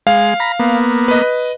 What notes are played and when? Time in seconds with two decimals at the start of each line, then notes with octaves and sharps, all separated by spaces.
0.07 G#3 F5
0.40 A#5 B5
0.60 A#3 B3
1.08 B4 D#5